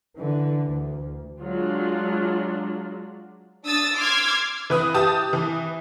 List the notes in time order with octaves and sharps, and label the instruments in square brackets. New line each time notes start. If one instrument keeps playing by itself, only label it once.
[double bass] D3 E3
D2
[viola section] F#3 G#3 D4 F4
[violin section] D4 D#6 E6 A6
C6 D6 E6 F6 G#6
[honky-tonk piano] E3 B4 D#6
G4 A5 D#6
E3